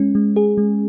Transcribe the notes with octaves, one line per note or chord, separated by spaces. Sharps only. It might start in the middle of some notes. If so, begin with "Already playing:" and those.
Already playing: G#3 C#4
G#3
G#4
G#3